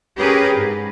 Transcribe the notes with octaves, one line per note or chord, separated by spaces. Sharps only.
C#4 G4 G#4 A#4 B4
G#2